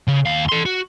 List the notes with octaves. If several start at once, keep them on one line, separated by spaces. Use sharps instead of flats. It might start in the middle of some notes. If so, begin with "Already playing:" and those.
C#3
D#2 F5
A4 C6
F#4